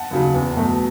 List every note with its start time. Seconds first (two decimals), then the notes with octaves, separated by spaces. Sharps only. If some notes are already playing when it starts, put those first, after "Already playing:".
Already playing: F#5 A5
0.11 D#2 C#3 F#3
0.34 E2
0.57 B2 F#3 A3